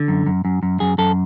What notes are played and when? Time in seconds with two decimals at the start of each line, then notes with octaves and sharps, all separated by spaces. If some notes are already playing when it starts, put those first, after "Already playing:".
Already playing: D3
0.08 F#2
0.26 F#2
0.45 F#2
0.63 F#2
0.80 F#2 G#4
0.98 F#2 A4